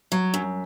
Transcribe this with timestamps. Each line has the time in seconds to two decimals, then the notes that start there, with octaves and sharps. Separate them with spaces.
0.12 F#3
0.34 F#2